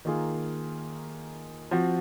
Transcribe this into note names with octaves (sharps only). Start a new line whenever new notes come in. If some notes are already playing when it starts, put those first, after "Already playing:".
D#3 A#3 F4 G#4
F3 C4 F#4